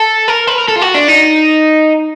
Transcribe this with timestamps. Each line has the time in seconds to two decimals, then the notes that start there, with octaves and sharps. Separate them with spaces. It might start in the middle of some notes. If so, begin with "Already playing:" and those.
Already playing: A4
0.28 A#4
0.47 B4
0.58 A#4
0.68 A4
0.76 F4
0.82 F#4
0.95 D4
1.08 D#4